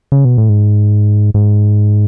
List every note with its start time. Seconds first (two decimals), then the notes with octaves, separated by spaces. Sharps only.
0.12 C#3
0.25 B2
0.38 A2
0.49 G#2
1.34 G#2